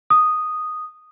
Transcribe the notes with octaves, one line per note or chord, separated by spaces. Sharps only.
D#6